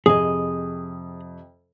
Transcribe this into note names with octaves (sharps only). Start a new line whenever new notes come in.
F2 C3 G#4 D#5 D#6